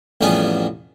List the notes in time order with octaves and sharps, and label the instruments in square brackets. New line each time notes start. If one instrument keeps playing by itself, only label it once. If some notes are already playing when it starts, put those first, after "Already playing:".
[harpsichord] A1 F2 G3 B3 G#4 G#5